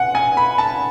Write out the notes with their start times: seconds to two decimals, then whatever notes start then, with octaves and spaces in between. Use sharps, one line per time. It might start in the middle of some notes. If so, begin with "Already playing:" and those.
Already playing: F#5 G#5
0.15 G#5
0.37 B5
0.58 A5